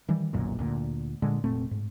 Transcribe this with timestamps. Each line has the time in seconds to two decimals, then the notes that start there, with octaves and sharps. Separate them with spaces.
0.09 D#3 E3 G3
0.33 F#1 B1 F#2 A#2
0.59 D2 A#2
1.22 A#2 D3 G#3
1.44 F1 A#2 A3 C4
1.71 G#2